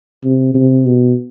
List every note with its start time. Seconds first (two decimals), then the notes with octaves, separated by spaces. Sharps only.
0.24 C3
0.54 C3
0.86 B2